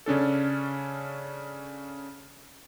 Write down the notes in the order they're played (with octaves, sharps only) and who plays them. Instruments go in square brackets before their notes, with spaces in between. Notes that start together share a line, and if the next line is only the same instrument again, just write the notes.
[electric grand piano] C#3 C#4 D4 A4